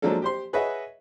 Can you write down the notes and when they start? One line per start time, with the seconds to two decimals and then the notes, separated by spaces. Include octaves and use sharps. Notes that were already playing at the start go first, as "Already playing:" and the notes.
0.02 F3 F#3 G#3 A#3 D4 A4
0.22 G4 C5 C6
0.53 G#4 B4 C#5 D#5 E5 F#5